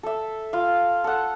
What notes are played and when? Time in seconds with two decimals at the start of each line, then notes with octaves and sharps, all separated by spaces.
0.03 A4 E5
0.53 F4 F5
1.04 A4 F#5